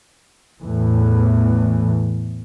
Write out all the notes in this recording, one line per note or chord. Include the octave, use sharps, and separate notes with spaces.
E2 A2 E3